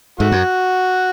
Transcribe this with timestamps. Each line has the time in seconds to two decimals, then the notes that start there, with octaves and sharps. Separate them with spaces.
0.20 G#2 A3 F#4
0.32 F#2